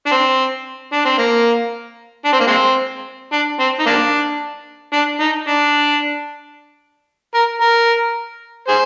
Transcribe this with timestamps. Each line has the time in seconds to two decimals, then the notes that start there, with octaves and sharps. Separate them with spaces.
0.06 D4
0.12 C4
0.93 D4
1.05 C4
1.18 A#3
2.25 D4
2.33 C4
2.40 A#3
2.47 G#3 C4
3.32 D4
3.60 C4
3.80 D#4
3.86 A#3 D4
4.93 D4
5.20 D#4
5.48 D4
7.35 A#4
7.61 A#4
8.68 G#4 C5